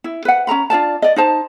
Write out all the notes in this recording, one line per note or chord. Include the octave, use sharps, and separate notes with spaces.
E4
B4 F#5
C#4 A#4 A#5 B5
D4 F4 D5 A5
D5 D#5
D#4 C5 A5